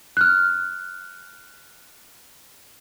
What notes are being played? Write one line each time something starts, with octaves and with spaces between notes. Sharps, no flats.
F6 F#6